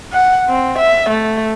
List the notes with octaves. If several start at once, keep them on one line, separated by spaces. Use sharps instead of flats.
F#5
C4
E5
A3